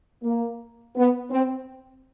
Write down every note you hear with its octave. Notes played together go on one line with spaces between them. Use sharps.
A#3
B3
C4